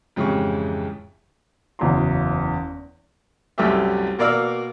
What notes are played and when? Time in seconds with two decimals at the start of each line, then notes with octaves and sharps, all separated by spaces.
0.16 F2 G#2 C#3 E3 G4 C#6
1.79 F#1 E2 F#3 E4 A#5 C6
3.58 C2 F#2 A3 E4 G4 E5
4.19 B2 A#3 A#4 D5 F5 E6